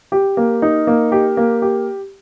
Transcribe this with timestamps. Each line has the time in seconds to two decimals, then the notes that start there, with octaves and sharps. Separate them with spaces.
0.12 G4
0.37 A#3
0.62 D#4
0.87 A#3
1.12 G4
1.37 A#3
1.62 G4